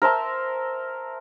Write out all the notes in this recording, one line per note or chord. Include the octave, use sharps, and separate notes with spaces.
A#4 C5 E5 A5